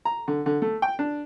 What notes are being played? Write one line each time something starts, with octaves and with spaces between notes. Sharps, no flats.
A#5
D3
D3
A3
G5
D4